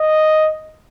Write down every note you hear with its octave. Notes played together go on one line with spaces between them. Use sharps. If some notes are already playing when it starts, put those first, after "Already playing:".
Already playing: D#5